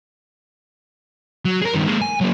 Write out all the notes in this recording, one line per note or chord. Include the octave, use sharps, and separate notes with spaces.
F#3
G#4 A#4
G2 D#3
G#3 A#3
G#5
F#3 A#3